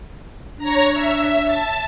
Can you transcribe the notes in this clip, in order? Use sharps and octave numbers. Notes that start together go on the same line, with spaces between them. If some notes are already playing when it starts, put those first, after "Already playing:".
D4 C#5 A#5
E5
A5